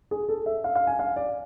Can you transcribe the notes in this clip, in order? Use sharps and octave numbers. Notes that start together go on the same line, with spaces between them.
G#4
A4
E5
F5
F5
G#5
F5
D5